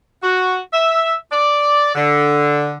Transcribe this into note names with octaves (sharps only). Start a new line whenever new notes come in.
F#4
E5
D5
D3